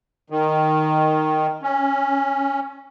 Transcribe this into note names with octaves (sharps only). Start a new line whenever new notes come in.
D#3
C#4